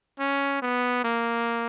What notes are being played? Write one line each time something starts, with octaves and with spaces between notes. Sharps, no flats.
C#4
B3
A#3